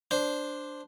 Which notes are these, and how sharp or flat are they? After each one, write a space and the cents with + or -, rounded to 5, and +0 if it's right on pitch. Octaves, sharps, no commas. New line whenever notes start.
D4 +0 C5 +0